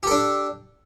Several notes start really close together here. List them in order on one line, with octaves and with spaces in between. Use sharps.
G4 A4 D4